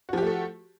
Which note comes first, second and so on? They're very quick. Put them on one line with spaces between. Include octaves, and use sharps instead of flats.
F#4 F3 G4 A3 A4